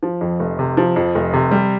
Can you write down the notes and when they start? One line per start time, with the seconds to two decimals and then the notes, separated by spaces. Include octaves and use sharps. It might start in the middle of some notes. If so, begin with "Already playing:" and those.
0.03 F3
0.21 F2
0.40 F1
0.59 C3
0.77 F3
0.96 F2
1.15 F1
1.34 C3
1.51 G3